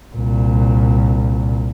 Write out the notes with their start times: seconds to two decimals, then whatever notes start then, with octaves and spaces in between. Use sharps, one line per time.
0.16 C2 A#2